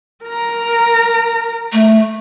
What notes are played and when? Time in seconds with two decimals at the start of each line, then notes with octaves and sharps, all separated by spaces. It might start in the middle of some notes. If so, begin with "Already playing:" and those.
0.25 A#4 A#5
1.73 A3